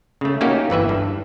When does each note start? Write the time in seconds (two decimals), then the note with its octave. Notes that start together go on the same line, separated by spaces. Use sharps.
0.21 C#3 A3
0.41 A3 A#3 C#4 D#4 F#4 G4
0.70 G1 E3 B4 E5
0.89 G2